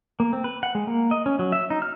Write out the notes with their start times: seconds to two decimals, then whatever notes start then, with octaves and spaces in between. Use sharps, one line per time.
0.20 A#3
0.33 C4
0.44 B4
0.63 F#5
0.75 G#3
0.87 A#3
1.11 D#5
1.26 C#4
1.39 F#3
1.52 E5
1.70 D#4
1.82 F6